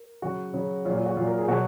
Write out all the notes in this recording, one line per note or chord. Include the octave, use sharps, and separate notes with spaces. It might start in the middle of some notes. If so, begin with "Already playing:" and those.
Already playing: A#4
C#3 F#3 F#4
C#3 F#3
A#2 F#3 F4
F4
F#4
A#2 F#3 F4
A#4
G#4
B2 F#3 F#4